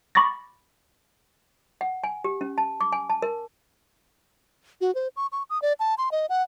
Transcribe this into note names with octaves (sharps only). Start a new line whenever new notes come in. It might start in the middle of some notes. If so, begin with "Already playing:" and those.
B5 C#6 D6 A6 A#6
F#5
G#5
G4
C#4
A5
D6
G#5
A5
A#4
F#4
C5
C#6
C#6
D#6
D5
A5
C6
D#5
F#5